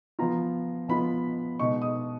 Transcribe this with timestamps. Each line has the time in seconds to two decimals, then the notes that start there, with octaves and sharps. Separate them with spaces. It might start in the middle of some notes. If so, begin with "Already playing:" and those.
0.19 F3 B3 F4 A#5
0.88 F3 B3 F4 B5
1.59 B2 G#3 D#4 C#6
1.82 D#6